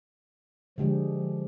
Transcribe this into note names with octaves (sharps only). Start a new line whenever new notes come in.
D3 F3 G#3 G4